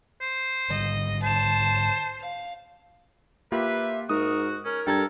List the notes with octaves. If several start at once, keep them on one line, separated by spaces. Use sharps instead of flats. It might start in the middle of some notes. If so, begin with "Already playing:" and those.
C5
G#2 D3 G3 D#5
C5 A5 E7
F5
A#3 F4 G4 B4 E5
G#2 F#4 A#4 D#6
C#4 A#4
G2 A4 G5 A#5 G#6